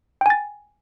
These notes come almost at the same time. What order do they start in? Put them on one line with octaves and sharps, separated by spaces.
G5 G#5 A6